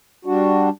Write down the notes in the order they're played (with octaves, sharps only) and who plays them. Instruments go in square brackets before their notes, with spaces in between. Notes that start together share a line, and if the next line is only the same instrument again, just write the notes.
[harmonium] G3 D4 F#4